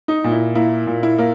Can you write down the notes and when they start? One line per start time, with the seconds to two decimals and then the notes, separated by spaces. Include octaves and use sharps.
0.08 D#4
0.24 A#2
0.32 E4
0.55 A#3 E4
0.87 A#2
1.03 E4
1.18 A#3